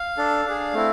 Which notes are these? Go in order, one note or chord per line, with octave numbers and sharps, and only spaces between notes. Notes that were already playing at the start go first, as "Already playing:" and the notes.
Already playing: F5
D4 A4
D4 G#4
A3 C4 E4